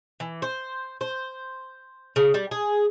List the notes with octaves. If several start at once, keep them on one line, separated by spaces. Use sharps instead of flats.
E3
C5
C5
C#3
G3
G#4